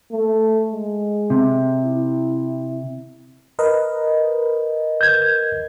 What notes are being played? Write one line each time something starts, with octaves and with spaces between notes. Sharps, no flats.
A3
G#3
C3
E4
A#4 B4 D#5
G6 G#6